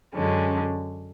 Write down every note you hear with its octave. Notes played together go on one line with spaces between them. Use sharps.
F#2 D3 G#3 C#4